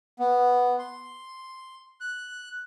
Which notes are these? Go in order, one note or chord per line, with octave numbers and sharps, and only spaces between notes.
B3
C6
F#6